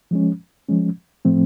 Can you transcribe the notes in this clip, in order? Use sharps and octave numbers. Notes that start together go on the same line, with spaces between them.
F3 G#3 C#4
F3 G#3 C#4
A2 F3 A3 C4